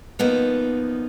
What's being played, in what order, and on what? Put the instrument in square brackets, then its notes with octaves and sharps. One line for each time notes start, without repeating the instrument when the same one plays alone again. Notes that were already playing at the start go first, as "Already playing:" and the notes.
[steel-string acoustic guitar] F#2 F3 A#3 B3 D#4